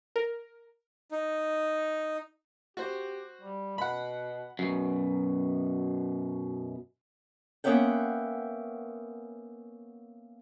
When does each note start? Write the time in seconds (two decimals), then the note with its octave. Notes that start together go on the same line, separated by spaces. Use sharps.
0.16 A#4
1.12 D#4
2.77 F#4 G4 C5
3.41 G3
3.78 B2 F#5 B5
4.59 F#2 B2
7.64 A#3 B3 C#4 E5 F#5 G5